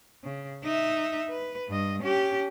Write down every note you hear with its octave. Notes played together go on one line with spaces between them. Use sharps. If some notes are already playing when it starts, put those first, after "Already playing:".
C#3
D#4 E5
B4
G2 D#5
C#4 G4